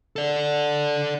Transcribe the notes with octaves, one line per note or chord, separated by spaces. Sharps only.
A4 D5